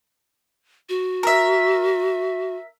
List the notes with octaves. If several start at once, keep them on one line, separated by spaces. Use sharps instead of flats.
F#4
A#4 E5